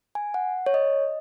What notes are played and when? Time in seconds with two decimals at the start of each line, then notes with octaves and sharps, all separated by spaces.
0.15 G#5
0.34 F#5
0.66 C#5
0.74 D#5